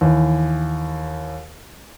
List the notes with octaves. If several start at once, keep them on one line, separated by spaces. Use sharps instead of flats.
D#2 E3